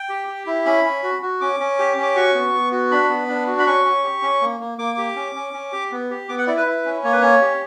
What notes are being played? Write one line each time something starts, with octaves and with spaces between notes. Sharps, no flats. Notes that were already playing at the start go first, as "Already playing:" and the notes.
Already playing: G5
G4
G4
E4
C#4 B5
C#4
F#4
F#4
C#4 D6
C#4
G4
C#4
D6
F#4 C#6
B3
B3
F#4
D4 B5
B3
D4
F#4
B5
C#4 C#6
C#4
G4
C#4
A#3
A#3
A#3 D6
G4
C#4
C#4
C#4
G4
B3
G4
B3 D6
F#5
E4 D5
B4
E4
C#4
A#3 C#5
B4
C#4 C#5
G4